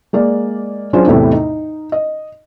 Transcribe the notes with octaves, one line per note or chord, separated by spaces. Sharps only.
G#3 A#3 D5
F#3 C#4 D4 F4 G#4 C5
E2 A2 C3 A3 E4
D#4
D#5